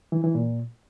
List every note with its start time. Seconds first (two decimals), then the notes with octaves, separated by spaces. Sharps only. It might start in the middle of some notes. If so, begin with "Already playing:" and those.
0.12 E3
0.23 E3
0.35 A#2